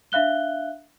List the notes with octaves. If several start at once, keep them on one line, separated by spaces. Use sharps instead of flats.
D4 E5 F5 F#6 G7